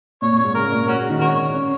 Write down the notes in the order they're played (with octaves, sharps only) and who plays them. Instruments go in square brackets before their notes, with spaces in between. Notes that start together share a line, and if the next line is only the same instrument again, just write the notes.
[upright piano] A#2 [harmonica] C#5
[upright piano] A#2
[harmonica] C#5
[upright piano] G#2
[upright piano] C#3 [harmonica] A#4
[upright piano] A#2
[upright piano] A#2 [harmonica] C#4 F#4
[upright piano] C#3
D#3
[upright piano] G#3 [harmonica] F#4 A#4 C#5
[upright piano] C#4